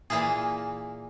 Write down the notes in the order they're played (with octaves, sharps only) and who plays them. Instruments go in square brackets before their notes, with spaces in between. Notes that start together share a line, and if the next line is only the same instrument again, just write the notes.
[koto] A#2 E3 A#3 E4 G#4